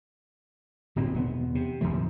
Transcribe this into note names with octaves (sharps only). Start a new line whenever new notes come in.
D1 G1 A#2 C4
E1 B3
C3
D1 G1 F3 A3